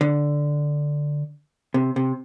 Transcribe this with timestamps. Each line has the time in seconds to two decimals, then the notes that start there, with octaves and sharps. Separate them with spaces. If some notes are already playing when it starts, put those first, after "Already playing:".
0.01 D3
1.74 C3
1.96 C3